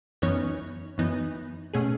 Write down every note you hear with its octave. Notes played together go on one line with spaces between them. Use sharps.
F#2 E3 B3 C#4 D#4 C#5
F#2 E3 B3 D#4
B2 A3 C#4 G#4